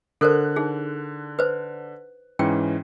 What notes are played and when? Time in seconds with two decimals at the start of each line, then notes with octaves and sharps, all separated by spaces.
0.21 D3 A4 A#4 C5 F#6
0.56 D#4 G#4
1.39 B4 C5
2.39 G#2 E3 C#4 G5